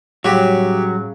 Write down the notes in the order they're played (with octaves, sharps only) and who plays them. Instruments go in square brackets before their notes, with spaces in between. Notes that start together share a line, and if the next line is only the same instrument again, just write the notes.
[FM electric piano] A2 G3 [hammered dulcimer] C#3 [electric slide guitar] F#3 [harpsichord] F#4 G4